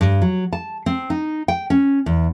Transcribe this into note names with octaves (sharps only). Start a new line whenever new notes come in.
G2
F#3
A5
C4
D#4
G5
C#4
E2